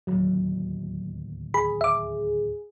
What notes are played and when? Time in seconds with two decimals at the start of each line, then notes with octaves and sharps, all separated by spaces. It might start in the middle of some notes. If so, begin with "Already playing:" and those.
0.07 D1 D#2 F#3
1.54 G#4 B5
1.81 E5 D6